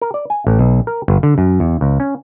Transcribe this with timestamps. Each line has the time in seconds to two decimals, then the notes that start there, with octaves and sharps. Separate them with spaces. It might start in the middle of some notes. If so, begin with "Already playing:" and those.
0.02 A#4
0.14 D5
0.30 G#5
0.47 A1
0.59 B1
0.87 A#4
1.08 G1
1.23 D3
1.38 F#2
1.60 E2
1.81 C#2
2.00 C#4